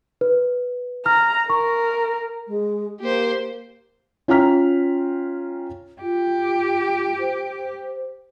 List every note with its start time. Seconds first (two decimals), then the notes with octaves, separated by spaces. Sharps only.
0.21 B4
1.06 A#5 F6
1.50 A#4 C#6
2.47 G#3
3.00 A#3 G4 C5
4.28 C#4 F4 G5 A#5 F6 B6
6.02 F4 G4
7.19 C5